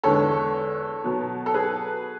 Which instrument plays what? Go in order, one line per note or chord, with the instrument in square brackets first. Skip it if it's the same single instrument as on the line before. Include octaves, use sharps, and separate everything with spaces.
[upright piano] E2 D3 G#3 B3 A4 C#5
B2 F#3 B3
A4
G#4 B4